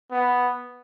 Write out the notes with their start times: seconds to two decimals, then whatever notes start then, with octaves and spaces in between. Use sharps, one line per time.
0.12 B3